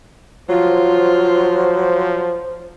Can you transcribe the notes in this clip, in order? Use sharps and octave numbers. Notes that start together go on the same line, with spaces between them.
F3 F#3 F4 C5